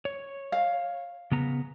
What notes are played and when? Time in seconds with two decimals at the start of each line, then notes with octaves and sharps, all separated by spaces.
0.05 C#5
0.52 F5
1.32 C#3 B3 A#5